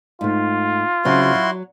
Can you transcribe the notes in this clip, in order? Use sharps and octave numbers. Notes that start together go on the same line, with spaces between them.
G#2 A3 F4
C#3 F#3 C4 E4 F#4 C6
F#3